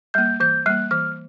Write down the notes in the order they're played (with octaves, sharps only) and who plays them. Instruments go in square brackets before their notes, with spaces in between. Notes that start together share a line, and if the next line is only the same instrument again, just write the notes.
[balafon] G3 A#3 [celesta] G6
[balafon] E3 [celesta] G6
[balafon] G3 A#3 [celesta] F#6
[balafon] E3 [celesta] F6